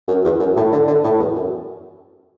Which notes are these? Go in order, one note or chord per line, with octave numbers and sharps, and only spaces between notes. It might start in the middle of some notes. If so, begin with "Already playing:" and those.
F#2
E2
F#2
A2
D3
D3
A2
E2
F#2